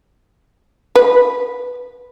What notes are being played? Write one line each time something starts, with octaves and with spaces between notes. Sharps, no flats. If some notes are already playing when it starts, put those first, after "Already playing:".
B4